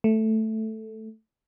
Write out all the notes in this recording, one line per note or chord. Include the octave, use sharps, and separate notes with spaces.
A3